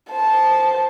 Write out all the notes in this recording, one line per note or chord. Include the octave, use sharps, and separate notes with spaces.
C5 A5